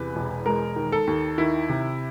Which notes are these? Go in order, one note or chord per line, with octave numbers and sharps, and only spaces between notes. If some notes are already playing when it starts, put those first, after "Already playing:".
Already playing: E2 C3 B4
E1
G#3 A#4
D#3
A4
D#2
D#3 E4
C3